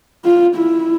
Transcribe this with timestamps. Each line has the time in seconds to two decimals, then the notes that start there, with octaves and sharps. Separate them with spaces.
0.25 F4
0.56 E4